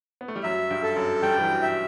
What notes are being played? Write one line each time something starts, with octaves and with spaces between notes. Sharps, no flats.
B3
A3
G3
F#2 F#3 E5
G2 G3
A4
F#2 F#3
G2 G3 G5
E3
F#2 F#3
E3
F#3 E5